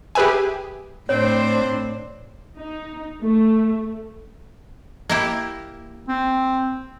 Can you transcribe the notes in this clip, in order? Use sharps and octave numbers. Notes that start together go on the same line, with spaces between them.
G4 G#4 B4 E5 G#5
A2 C4 D4 C5 C#5
D#4
A3
A#3 E4 G4
C4